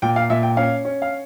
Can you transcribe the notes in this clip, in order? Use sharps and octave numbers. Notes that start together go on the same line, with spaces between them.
A#2 G5
F5
A#2 E5
G5
C#4 F5
C#4
F5